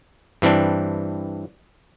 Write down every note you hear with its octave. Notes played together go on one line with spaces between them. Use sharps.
G2 E3 C4 D4